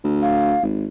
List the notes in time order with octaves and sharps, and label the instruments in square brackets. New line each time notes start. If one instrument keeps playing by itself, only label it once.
[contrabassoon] D2
[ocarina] F5
[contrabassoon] G#1